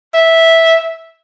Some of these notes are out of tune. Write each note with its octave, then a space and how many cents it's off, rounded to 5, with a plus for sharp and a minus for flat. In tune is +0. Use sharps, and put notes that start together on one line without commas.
E5 -10